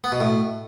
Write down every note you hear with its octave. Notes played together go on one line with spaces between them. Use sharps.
B3
B2
A2